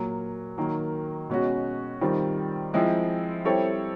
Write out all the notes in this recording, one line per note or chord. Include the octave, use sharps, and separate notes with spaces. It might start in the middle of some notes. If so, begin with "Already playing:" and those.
Already playing: A#2 F#3 A#3
D#3 F#3 A#3
B2 G#3 C#4 F#4
D#3 G3 C4 F4
F3 G#3 C4 E4
G3 C4 E4 A4 C#5